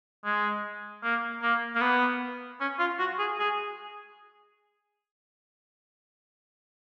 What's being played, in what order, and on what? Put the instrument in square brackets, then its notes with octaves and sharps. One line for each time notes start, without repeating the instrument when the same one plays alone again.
[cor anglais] G#3
A#3
A#3
A#3
B3
C#4
F4
F#4
G#4
G#4